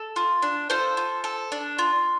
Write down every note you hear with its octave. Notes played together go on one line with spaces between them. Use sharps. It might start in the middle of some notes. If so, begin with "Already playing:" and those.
Already playing: A4
F4
D4
F4 A4 C5
F4
A4
D4
F4